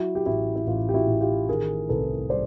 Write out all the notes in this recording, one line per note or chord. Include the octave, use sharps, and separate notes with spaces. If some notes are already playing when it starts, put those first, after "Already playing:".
Already playing: F#3 E4 F#4
G4
A1 E4 F#4
E4
A1 F4
G4
E4 F#4
A2
F4 G4
D#3 G#4 A#4
C2 A4 B4
G3 C5 D5